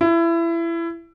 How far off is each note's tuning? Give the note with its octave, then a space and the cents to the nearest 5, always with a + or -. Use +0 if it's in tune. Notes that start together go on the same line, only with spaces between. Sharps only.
E4 +25